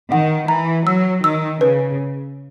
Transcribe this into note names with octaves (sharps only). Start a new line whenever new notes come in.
D#3 F#5
E3 A#5
F#3 E6
D#3 E6
C#3 B4